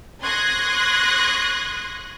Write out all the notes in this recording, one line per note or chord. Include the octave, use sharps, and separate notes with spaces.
C6 C#6 D#6 F#6 G#6 A#6